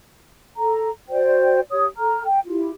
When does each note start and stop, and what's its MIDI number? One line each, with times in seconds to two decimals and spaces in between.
0.57 0.88 69
0.57 0.88 82
1.09 1.61 66
1.09 1.61 72
1.09 1.61 74
1.09 1.61 79
1.70 1.87 67
1.70 1.87 73
1.70 1.87 87
1.97 2.24 69
1.97 2.24 82
1.97 2.24 89
2.25 2.39 79
2.47 2.71 64
2.47 2.71 65
2.47 2.71 67